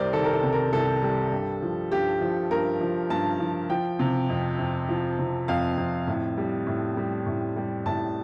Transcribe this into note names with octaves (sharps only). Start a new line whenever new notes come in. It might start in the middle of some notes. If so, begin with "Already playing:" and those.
Already playing: C2 C3 G3 A#4 C5 D5
D#3 A4
A#4
A4
C3
A#4
C2 A4
G3
G2
F3
G2 G4
F3
G2 A#4
F3
G2 A5
F3
F3 G5
C3
F2
F2
F3
C3
F2 F5
F2
A2
G3
A2
G3
A2
G3
A2 A5